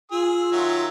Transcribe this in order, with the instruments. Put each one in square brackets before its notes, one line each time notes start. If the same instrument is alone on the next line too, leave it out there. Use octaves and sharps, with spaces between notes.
[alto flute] F4 [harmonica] G#4 E6
[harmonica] D#3 F#3 E5